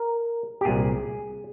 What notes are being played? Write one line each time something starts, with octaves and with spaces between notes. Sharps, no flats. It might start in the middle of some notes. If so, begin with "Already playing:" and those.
Already playing: A#4
G4
C2 A#2 G#4